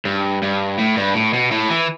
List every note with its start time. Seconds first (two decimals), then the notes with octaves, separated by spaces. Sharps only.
0.05 G2
0.42 G2
0.78 A2
0.97 G2
1.15 A2
1.34 B2
1.52 A2
1.70 E3